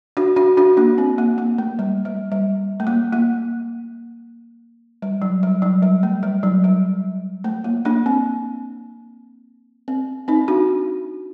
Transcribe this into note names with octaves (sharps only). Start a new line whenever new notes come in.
D4 F#4
D4 F#4
D4 F#4
A#3 D4
C4
A#3
A#3
A3
G3
G3
G3
A3
A#3
A#3
G3
F#3
G3
F#3
G3
A3
G3
F#3
G3
A3
A#3
A#3 D4
C4
C4
C4 D#4
D4 F#4